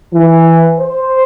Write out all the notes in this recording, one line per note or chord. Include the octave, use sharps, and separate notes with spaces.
E3
C5